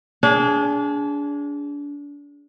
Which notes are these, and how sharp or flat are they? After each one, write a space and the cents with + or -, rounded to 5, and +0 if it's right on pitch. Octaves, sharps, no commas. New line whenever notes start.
D4 -30 G#4 +0